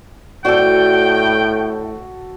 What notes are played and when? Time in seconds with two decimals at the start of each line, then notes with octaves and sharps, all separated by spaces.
0.45 A2 F#4 A4 C5 D5 G5